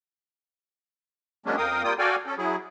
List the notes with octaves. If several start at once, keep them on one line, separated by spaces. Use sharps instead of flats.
F#3 G#3 A#3 C#4 D4
F2 A#4 F5 G5 D#6
G3 A#3 F4 G5 D#6
F#4 A4 D5 F5 G5 G#5
C#4 A4
F#3 E4 G#4